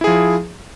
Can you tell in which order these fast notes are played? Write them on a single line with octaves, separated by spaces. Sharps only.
E4 G#4 F3